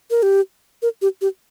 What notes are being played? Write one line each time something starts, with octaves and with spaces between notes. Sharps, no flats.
A#4
G4
A#4
G4
G4